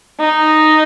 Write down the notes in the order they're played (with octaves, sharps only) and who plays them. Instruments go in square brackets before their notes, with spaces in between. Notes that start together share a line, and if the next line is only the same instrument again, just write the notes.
[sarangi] D#4